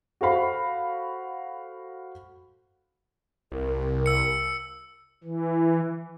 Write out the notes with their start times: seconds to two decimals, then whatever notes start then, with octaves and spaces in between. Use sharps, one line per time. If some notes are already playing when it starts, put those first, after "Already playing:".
0.21 F#4 A4 C5 F5 B5
3.52 C2 A#4
4.06 E6 C#7
5.24 E3